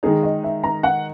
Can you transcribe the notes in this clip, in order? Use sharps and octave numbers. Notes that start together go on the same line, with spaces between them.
D#3 G#3 D#4 G#4
D#5
E5
A#5
F#5